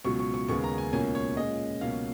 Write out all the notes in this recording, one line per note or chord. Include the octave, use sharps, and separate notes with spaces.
C#2 B2 F#3 C#6
C#6
C#6
D#2 C#3 G#3 B3 C#6
A#5
G#5
C#2 B2 A#3 C#4 G#5
C#5
A#2 G#3 C#4 D#5
C#2 B2 F#3 A#3 C#4 F5